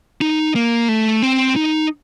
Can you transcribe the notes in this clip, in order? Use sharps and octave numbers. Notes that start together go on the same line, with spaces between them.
D#4
A#3
A3
C4
D#4